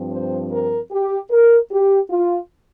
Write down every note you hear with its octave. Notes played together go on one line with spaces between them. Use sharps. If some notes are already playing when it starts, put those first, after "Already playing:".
Already playing: G2 F3 C4
C5
A#4
G4
A#4
G4
F4